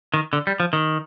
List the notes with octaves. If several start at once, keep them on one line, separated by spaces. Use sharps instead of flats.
D#3
D3
G3
F3
D#3